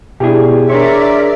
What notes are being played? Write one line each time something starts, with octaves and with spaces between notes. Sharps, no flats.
B2 D4 E4 G4 G#4
D4 G#4 A#4 C#5 D5 E5 C6